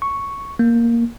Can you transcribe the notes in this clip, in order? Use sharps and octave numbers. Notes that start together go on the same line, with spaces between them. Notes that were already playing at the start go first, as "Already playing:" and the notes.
C#6
A#3